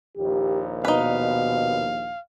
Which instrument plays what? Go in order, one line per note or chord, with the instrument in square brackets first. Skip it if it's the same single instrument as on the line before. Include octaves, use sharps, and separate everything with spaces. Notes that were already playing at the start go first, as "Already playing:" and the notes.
[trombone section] A#1 D#2 [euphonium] G4
[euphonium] B2 [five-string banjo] D#4 B4 [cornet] F5